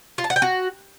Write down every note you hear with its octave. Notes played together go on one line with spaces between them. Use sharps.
F4
A5
F#5
G5
F#4